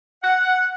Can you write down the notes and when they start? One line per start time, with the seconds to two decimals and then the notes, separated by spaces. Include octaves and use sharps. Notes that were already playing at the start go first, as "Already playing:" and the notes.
0.23 F#5